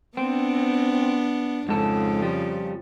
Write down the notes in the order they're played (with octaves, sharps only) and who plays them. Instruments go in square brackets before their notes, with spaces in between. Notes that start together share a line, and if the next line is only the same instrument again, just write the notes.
[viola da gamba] B3 D4 [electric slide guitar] C4
[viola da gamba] F2 C#3 [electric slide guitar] G#2 A4
[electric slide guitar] F3 G3